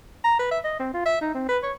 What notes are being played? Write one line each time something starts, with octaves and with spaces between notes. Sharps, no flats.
A#5
B4
E5
D#5
C4
F4
E5
D#4
C4
B4
C#5